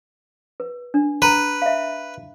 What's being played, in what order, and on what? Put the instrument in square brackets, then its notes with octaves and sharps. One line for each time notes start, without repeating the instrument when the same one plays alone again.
[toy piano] B4
D4
[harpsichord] B4 [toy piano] A#5
[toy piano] E5 F5